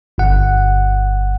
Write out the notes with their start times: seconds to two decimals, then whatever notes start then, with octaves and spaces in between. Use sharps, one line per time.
0.18 G1 F#5